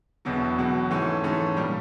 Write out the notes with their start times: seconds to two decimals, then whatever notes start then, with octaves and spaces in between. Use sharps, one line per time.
0.25 E1 E2 B2 F#3
0.58 E1 E2 B2 F#3
0.91 G#2 E3 A3 C#4
1.24 G#2 E3 A3 C#4
1.57 A#2 G3